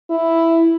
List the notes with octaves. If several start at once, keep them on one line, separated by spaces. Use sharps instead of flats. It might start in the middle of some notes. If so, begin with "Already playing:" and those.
E4